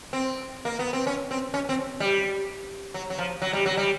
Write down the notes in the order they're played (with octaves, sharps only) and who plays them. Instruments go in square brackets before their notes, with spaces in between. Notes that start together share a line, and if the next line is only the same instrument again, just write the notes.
[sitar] C4
A#3
B3
C4
C#4
C4
C#4
C4
G3
F#3
F#3
F3
F#3
G3
F#3
G3